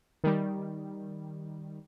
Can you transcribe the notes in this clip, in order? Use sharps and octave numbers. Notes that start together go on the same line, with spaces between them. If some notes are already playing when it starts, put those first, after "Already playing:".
D#3 G3